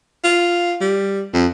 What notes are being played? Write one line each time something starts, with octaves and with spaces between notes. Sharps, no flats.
F4
G3
F2